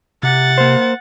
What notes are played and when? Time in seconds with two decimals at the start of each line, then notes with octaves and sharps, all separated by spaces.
0.23 C3 F#5 A6
0.58 A#3 C5